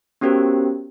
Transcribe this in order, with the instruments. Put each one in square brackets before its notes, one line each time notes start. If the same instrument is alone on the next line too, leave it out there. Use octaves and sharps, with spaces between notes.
[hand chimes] B3 C#4 F#4 G4 A#4 C5